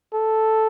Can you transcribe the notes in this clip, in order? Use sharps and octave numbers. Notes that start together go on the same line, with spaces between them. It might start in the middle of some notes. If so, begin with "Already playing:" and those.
A4